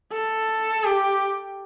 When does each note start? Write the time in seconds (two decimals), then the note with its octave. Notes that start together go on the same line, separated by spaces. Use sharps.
0.13 A4
0.84 G4